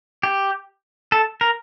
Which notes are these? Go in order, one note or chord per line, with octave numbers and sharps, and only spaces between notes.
G4
A4
A#4